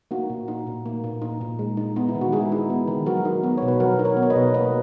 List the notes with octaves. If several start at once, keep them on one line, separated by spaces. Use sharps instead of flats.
A#3 D#4 F#4
A#2
D#4
A#2
A#3
A#2
D#4
A#2
G#3
D#4
B3 D#4
E4
D#3
F#4
G#3 E4 G#4
D#4
B3
D#3
F#3 F#4 A#4
D#4
B3
B2 C#5
B4
F#3 F#4 A#4
D#4
A#4 C#5
B3
C#5
B4 D#5
B2
A#3 B4 D#5